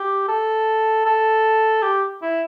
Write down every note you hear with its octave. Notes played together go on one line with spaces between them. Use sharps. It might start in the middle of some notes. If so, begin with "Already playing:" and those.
Already playing: G4
A4
A4
G4
E4